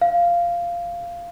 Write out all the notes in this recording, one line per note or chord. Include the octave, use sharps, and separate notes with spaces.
F5